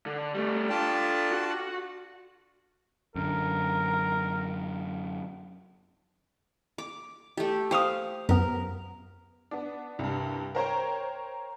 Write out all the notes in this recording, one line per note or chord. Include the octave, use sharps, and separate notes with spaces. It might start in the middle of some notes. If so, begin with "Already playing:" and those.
D3
G3 A3
D4 F4 A4 G5 A5
F#4
F#2 D3 A#4
D6
A3 G4
C5 F5 G5 C#6 D#6
F#2 B3 A#4
B3 D4
C2 G2
A#4 C5 C#5 G5